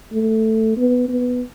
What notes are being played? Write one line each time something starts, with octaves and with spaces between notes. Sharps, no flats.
A3
B3
B3